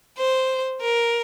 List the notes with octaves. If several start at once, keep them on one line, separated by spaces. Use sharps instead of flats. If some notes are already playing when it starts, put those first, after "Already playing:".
C5
A#4